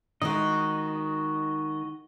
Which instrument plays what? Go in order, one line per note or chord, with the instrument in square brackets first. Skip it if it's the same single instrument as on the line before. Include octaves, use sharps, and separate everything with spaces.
[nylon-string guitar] D#3 G#3 [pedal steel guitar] F#4 D#5